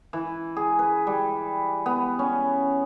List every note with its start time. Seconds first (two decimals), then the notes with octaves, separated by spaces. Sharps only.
0.13 E3
0.56 G#4
0.79 B4
1.07 G3
1.86 B3
2.19 C#4